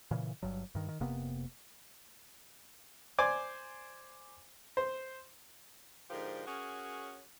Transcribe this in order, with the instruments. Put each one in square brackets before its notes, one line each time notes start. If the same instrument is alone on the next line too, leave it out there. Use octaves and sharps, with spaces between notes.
[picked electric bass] A#2 C#3 E3
G1 G2 F#3
G2 D#3
D#3
F1 C3 A#3 B3
[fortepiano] C5 D5 G#5
C5
[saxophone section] G#2 D3 F3 G4 A#4
C#4 F#4 G#4 A#4 C#5